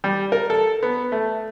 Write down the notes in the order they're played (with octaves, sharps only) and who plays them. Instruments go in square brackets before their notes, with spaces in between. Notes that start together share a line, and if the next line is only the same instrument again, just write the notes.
[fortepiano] G3
A#4
A4
B3
A3